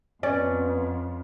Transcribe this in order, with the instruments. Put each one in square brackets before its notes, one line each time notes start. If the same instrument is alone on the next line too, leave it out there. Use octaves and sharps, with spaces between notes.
[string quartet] F2 [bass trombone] B3 [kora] C#4 [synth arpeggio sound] D5